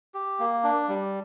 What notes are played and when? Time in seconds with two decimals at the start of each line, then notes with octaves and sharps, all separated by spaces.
0.14 G4
0.39 A#3
0.64 D4
0.89 G3